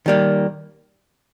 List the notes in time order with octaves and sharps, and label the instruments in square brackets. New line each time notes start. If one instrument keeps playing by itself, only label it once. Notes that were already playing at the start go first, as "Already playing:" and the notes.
[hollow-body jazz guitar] D#3 G3 A#3